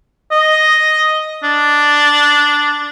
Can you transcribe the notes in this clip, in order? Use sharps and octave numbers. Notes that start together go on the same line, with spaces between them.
D#5
D4